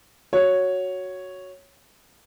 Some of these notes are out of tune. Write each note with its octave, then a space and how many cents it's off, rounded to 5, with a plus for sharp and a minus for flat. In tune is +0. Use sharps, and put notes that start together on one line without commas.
F#4 +0 C#5 +0